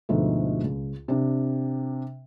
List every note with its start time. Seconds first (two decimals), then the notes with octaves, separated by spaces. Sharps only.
0.09 D2 G#2 B2 F3 G#3 A3
0.64 C#2
1.08 C3 D4